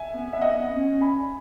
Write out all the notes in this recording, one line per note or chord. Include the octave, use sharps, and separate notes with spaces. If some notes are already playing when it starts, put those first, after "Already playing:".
Already playing: E5 G#5
B3
E5
D#5 F#5
C#4
G#5 B5